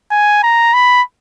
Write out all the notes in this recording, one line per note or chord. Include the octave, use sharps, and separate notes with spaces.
G#5
A#5
B5